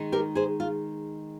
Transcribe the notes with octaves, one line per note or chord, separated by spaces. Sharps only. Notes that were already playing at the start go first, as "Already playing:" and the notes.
Already playing: D#3 G#3 D#4
G4 A#4
G#4 C5
F4